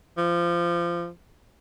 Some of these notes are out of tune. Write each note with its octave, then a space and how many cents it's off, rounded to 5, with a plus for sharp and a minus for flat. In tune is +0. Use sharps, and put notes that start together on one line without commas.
F3 -20